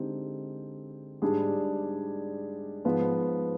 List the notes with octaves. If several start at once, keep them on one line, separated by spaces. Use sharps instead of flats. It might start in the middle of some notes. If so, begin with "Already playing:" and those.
Already playing: D3 G#3 C4 D#4 G4
G#2 G3 D4 G#4
G#2 F3 B3